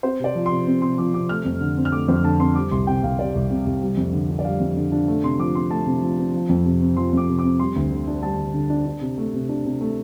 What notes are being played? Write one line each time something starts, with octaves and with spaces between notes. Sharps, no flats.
C4 C5
C3 D5
F3
C3 C6
C4
C3 C6
F3 D6
C3 D6
A3 F6
F2
D3
C4
F6
A3 D6
F2 C5
D3 A5
C4 C6
G3 D6
C2 C6
C3 G5
C2 F5
G3 D5
C2
C3
C2
G3
F2
D3
D4
D5
G3 F5
F2
D3
D4
A3
C3 C6
F3 D6
C4 C6
A3 A5
C3
F3
C4
F3
F2
C3
C4
F3 C6
F2 D6
C3
D6
C4
G3 C6
D2
D3
D4
G3 A5
D2
D3
D4
D4
C3
A3
C3
D4
C3
A3